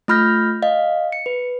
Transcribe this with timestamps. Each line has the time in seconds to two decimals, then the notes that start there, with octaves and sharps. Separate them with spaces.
0.08 A3 F4 B5 F6 G6 A#6
0.62 D#5 F5
1.12 C#7
1.26 B4